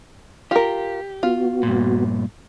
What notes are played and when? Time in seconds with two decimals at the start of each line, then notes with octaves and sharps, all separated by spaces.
0.51 F4 G4 A#4
1.23 B3 F4 F#4
1.63 G2 A#2